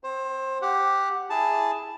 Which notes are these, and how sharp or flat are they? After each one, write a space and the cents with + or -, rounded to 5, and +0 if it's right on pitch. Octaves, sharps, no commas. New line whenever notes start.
C4 -15 C5 +25
G4 +0 F#5 +0
E4 -5 G#4 +0 A5 +0